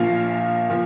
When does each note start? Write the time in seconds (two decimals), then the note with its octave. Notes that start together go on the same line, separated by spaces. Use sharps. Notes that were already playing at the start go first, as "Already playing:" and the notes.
Already playing: A#1 A#2 F3 F5
0.69 A#2 F3